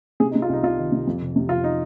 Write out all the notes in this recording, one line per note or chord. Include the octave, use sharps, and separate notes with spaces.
C3 G#4
D#4
C3
F4
C2 D#4
C2 F4
D#3
C3
F2
F1
C3
F1 F4
D#4